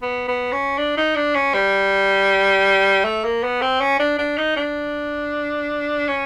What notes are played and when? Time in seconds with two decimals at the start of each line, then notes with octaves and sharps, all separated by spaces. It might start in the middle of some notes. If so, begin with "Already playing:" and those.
0.02 B3
0.28 B3
0.52 C#4
0.78 D4
0.97 D#4
1.16 D4
1.35 C#4
1.54 G3
3.04 A3
3.24 A#3
3.43 B3
3.61 C4
3.81 C#4
3.99 D4
4.19 D4
4.38 D#4
4.56 D4
6.09 C#4